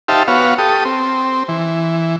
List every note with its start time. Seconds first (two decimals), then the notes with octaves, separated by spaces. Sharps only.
0.08 D#4 G4 C5 E5 F5 A5
0.28 B3 F#4 C#5 F5
0.58 G4 A4 D#6
0.85 C4
1.49 E3